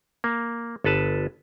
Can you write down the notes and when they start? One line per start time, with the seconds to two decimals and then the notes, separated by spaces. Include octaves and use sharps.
0.24 A#3
0.84 G1 A4 B4 A5